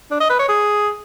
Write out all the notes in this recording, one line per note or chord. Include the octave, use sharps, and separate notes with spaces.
D4
D#5
B4
C#5
G#4